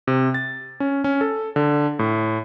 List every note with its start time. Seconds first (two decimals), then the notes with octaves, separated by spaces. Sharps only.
0.07 C3
0.34 A6
0.80 C#4
1.04 C#4
1.21 A4
1.56 D3
1.99 A2